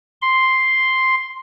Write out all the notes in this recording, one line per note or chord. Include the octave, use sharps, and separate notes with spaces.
C6